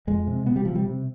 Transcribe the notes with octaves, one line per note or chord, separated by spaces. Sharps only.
F2 G#3
C3
C3 B3
G3
C3 F3
G3
C3